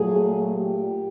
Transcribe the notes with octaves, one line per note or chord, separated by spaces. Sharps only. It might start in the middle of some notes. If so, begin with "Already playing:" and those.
Already playing: A#2 F#3 A3 G#4
G4